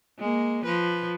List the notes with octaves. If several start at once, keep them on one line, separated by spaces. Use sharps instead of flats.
G#3 A#3
F3 B4